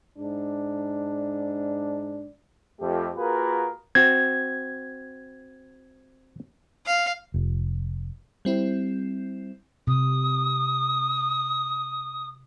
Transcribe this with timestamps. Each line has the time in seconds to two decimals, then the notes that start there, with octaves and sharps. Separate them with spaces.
0.16 G#2 D4
2.80 F2 A3 G4
3.16 A#3 F4 F#4 G#4 A#4 B4
3.95 C4 F#4 G#6
6.86 F5
7.34 F1
8.45 G3 C4 E4
9.87 C3 D#6